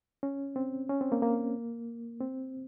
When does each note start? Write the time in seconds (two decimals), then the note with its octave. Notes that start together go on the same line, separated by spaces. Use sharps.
0.23 C#4
0.56 C4
0.89 C#4
1.01 C4
1.12 A#3
1.22 A#3
2.21 C4